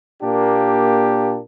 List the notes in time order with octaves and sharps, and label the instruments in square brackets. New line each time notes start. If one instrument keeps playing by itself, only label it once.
[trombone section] A#2 A#3 D4 G4